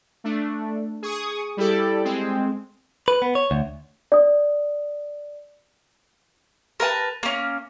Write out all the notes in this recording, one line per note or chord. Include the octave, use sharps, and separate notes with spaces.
A3 D4
G#4 C#6 D#6
G3 E4 G4 A4 D5
G#3 C4
B4
B3
C#5
D2
D5 D#6
A#4 B4 F#5 A5
A#3 C#4